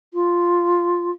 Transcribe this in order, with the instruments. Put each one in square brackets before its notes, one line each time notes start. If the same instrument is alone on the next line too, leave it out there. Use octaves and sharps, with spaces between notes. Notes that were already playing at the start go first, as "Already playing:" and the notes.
[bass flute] F4